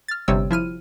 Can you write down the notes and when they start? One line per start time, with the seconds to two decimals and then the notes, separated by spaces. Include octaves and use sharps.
0.08 F6 A6
0.28 G1 C3 G3 C#5 G5 E6
0.51 F3 E4 F6 D#7